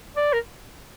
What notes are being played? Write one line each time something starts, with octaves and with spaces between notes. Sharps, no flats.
D5
A#4